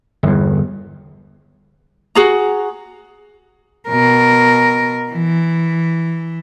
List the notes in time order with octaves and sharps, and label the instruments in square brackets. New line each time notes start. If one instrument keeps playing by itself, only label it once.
[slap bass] G1 E2
[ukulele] F#4 G#4 A#5
[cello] B2 A#4
E3